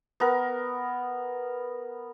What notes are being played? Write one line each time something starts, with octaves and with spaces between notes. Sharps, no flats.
B3 A#4